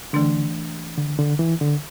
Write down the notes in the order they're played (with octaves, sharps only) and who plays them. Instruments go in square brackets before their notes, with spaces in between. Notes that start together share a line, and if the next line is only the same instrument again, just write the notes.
[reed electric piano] D3 [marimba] E3 A3 D4
[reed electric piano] D3
D3
E3
D3